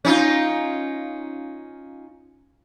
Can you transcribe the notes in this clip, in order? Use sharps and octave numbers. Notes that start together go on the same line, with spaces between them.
C#4 D#4 F4